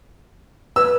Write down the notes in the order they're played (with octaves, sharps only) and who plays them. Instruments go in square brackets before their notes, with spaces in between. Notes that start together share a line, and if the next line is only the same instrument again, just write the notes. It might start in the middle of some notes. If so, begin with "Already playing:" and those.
[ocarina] B4 [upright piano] E6